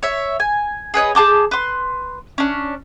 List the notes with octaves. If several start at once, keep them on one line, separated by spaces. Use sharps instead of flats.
C#5 E5
G#5
G#4 B4 C#5 D#5
G#4 A5 D6 G6
B4 C6
C#4 D4